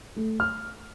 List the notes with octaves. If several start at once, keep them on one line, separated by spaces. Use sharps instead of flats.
A3
F6